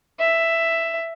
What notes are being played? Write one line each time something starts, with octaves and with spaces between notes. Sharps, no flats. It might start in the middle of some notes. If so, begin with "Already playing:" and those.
E5